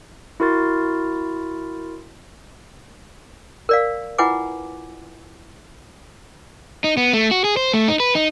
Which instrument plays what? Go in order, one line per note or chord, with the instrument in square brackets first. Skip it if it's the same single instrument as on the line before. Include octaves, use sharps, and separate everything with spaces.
[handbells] E4 F#4 A#4 C6 A6
[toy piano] A#4 D5 F5
E4 F4 B4 F#5 G#5 D6
[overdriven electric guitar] D#4
B3
A3
F#4
G#4
C5
A3
D#4
B4
D#4